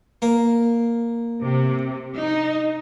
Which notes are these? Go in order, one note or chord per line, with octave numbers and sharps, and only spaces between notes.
A#3
C3
D#4